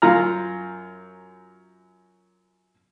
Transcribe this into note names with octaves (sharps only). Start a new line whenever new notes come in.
F#2 F4 A#5 F6